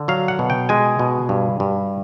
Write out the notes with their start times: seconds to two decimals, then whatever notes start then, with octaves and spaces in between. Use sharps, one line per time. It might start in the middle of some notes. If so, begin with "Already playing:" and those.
Already playing: D3
0.08 F#3 F5
0.28 F#5
0.39 B2
0.50 G5
0.69 G#3 G#5
0.99 B2
1.29 G2
1.60 G2